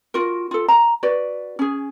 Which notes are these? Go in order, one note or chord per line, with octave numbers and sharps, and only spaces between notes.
F4 F#4 A#4
F4 A4
A#5
F#4 B4 D5
C#4 G#4